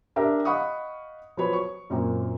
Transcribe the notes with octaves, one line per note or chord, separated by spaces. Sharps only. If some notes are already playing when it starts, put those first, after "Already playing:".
D4 G4 A#4 E5
D#5 F5 F#5 B5 C#6 D#6
F3 F#3 B4 C#5 B5
C#6
F#2 A#2 A#3 C4